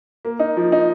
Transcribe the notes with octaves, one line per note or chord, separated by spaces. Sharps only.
A#3
D#4
F3
D#4